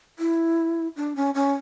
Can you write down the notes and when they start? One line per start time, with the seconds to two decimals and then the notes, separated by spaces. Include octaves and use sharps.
0.19 E4
0.96 D4
1.16 C#4
1.34 C#4